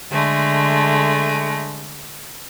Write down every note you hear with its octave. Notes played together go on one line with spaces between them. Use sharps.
D3 G#3 A3